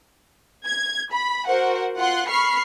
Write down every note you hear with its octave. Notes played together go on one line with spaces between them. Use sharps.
G#6
B5
F#4 A#4 C5 F#5
F4 F#5 C6 F#6
B5 C#6 F6 C7